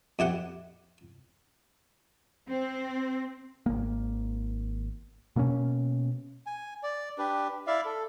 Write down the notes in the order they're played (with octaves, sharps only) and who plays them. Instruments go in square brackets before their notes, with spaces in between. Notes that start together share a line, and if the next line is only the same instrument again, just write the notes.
[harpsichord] F2 E4 G4 F#5
[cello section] C4
[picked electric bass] G#1 A#3
B2 A#3 C4 C#4
[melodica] G#5
D5
D4 G4 B4
E4 D5 E5 F5
A4